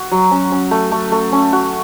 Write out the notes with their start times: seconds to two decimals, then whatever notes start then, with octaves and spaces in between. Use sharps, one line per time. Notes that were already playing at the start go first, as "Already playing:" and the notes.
Already playing: F#4
0.11 F#3
0.31 C#4
0.52 C#4
0.71 A3
0.91 A3
1.12 A3
1.32 C#4
1.52 F#4